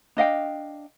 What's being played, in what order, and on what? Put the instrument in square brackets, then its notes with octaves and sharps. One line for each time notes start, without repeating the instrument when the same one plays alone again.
[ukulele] D4 D#5 F5 G5